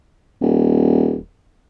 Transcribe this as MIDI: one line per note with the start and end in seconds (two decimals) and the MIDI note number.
0.41 1.23 27